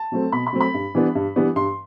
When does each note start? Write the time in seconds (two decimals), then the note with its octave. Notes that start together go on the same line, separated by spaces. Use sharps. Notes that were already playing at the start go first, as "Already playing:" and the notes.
Already playing: A5
0.12 F#3 A3 C4
0.32 B2 B5
0.47 B5
0.53 F#3 A3 C4
0.60 B5
0.74 G2
0.95 E3 G3 B3 D4
1.15 G2
1.36 E3 G3 B3 D4
1.56 G2 C6